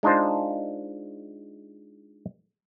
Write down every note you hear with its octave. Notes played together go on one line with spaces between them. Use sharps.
G#3 D4 D#4 F4 C5